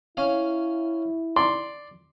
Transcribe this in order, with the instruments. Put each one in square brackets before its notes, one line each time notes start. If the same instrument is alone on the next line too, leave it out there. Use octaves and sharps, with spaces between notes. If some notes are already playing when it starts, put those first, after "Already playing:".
[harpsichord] C#4 F5 [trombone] E4
[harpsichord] D5 [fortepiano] C6